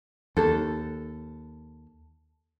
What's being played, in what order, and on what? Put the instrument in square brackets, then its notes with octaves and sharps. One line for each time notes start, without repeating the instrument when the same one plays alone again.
[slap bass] D#2 [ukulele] A4